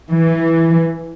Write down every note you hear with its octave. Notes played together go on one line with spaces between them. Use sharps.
E3